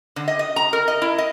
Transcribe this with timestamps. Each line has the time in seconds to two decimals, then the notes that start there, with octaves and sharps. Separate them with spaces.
0.16 D3
0.28 D#5
0.39 D#5
0.56 A#5
0.73 A#4
0.88 D#5
1.02 E4
1.18 D#5